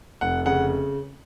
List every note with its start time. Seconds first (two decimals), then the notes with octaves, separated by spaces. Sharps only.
0.21 F1 F#5
0.46 C#3 F#5